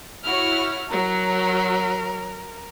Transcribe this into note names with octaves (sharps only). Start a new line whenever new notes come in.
E4 F#4 C#5 F6
F#3 A#4